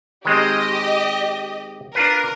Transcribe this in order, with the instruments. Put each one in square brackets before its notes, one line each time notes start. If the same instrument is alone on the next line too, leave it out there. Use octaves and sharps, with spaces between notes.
[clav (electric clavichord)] D#3 G#3 C4 [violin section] G4 D#5
[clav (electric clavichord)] D4 F4 B4 [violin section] A#4